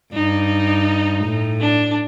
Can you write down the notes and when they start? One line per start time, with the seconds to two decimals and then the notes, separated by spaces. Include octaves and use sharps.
0.13 G2 D#4
1.24 A2
1.60 D4